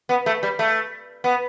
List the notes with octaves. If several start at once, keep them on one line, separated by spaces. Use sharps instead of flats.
B3
A3
G3
A3
B3